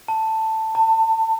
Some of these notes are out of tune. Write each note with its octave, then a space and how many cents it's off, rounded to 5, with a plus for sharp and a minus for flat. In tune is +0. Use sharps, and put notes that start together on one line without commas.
A5 +10
A5 +30